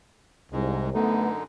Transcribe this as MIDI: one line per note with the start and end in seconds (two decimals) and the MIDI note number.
0.52 0.91 36
0.52 0.90 44
0.52 0.90 56
0.94 1.43 42
0.94 1.43 50
0.94 1.28 57
0.94 1.28 59
0.94 1.43 63